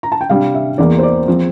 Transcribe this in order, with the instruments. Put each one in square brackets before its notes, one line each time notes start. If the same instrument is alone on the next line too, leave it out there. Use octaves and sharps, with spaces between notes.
[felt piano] A#5
A5
G5
C3 G3 D4 F5
E5
E2 E3 A#3 D5
C5
D5
F3 C4